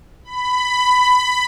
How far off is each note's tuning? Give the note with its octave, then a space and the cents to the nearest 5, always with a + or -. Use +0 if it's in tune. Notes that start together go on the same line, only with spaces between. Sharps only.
B5 +15